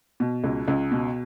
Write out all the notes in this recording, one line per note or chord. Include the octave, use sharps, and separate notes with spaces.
B2
C#2
C#2
B2